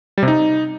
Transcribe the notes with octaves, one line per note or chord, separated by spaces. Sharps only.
G3
C3
D#4